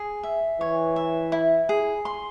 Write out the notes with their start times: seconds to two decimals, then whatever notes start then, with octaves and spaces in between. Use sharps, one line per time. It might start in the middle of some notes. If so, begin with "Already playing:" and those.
Already playing: G#4
0.23 E5
0.60 E3 C#5
0.96 E5
1.32 E4
1.69 G#4
2.05 C6